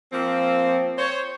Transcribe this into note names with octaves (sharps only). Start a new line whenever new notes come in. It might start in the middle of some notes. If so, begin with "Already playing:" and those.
F3 A#3 C4
C5 C#5